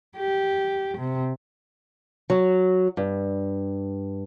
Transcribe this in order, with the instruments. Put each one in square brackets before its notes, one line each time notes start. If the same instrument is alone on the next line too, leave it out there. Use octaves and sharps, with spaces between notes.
[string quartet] G4
C3
[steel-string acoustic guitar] F#3
G2